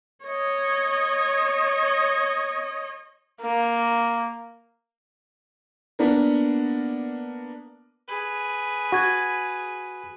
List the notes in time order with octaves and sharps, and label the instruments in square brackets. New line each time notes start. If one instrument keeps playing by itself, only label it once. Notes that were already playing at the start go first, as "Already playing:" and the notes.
[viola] C#5 D#5
[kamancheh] A#3
[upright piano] A#3 B3 D4 A#4
[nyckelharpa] G#4 B4
[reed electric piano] F#4 G#6